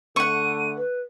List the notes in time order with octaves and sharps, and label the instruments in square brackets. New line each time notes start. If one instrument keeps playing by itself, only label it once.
[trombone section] D3 A3 [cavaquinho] F#5 C#6 [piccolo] D#7
[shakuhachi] B4